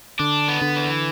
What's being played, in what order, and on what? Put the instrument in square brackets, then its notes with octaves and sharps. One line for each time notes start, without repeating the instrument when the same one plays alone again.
[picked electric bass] D3 [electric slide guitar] D4
[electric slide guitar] B3
[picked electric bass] D3
[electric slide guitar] E3